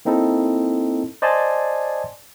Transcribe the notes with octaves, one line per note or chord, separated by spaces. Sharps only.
A#3 C4 D#4 E4 A4
C5 D5 D#5 G#5 A5 C6